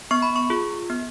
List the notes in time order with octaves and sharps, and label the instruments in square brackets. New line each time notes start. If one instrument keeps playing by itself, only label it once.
[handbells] B3 C#6
B5
C#6
F4 G#4
B3